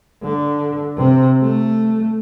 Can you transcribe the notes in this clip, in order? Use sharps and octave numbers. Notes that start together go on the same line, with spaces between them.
D3
C3
A3